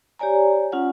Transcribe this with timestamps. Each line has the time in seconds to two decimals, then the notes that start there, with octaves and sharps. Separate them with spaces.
0.19 G4 C#5 D5 G#5 A#5
0.72 C#4 F4 F#5